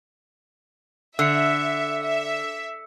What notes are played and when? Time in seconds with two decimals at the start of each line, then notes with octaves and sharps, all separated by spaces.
1.19 D3 E5 E6 C#7
2.04 E5